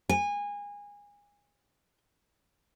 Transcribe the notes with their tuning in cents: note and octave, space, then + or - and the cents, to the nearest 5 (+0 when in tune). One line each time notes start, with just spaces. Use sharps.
G#5 -25